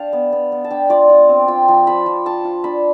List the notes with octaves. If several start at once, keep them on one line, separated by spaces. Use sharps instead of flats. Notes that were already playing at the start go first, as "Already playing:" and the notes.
Already playing: D4 F5 G5 A5
B3
B3
B3
A5
D4 G5
F4 D5
F4
C4
F4 G5
F3
F3 B5
F3
F4 A5
F4
D4 B5